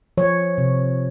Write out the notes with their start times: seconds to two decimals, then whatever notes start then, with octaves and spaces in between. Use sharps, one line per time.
0.17 F3 C#5
0.58 C3